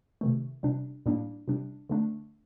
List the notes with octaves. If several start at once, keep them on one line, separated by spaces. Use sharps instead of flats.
C3 D#3 A3
C3 G3 D4
A2 G3 A#3 D4
C3 G3 D4
D3 A3 D4